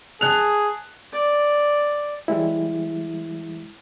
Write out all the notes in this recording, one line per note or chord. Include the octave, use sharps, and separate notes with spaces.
G#4 A5 F#6 F7
D5
E3 G3 G#3 E4